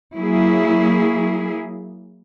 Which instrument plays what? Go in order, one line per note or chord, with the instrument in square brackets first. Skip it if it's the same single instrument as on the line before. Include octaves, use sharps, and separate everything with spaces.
[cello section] F#3 A#3 E4 G#4